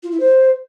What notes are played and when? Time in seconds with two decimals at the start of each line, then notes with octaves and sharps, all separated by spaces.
0.02 F4
0.11 E4
0.19 C5